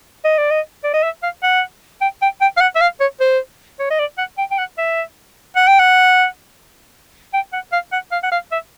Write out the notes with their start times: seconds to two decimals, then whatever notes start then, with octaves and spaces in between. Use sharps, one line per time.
0.24 D#5
0.38 D5
0.50 D#5
0.84 D5
0.94 D#5
1.03 E5
1.23 F5
1.43 F#5
2.01 G5
2.22 G5
2.41 G5
2.57 F5
2.61 F#5
2.76 E5
2.81 F5
3.00 C#5
3.21 C5
3.80 C#5
3.91 D#5
3.99 D5
4.18 F#5
4.38 G5
4.51 G5
4.58 F#5
4.78 E5
5.56 F#5
5.68 G5
5.79 F#5
7.33 G5
7.53 F#5
7.72 F5
7.92 F#5
8.12 F5
8.23 F#5
8.32 F5
8.52 E5